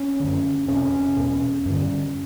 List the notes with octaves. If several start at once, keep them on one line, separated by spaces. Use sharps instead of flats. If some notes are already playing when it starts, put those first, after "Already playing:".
Already playing: C#4
F#2 D3
F2 C3 C#4
E2 B2
G2 D3